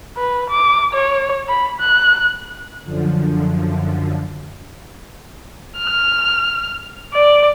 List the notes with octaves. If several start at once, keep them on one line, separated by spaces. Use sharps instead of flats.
B4
D6
C#5
B5
F#6
F#2 D3 F3
F6
D5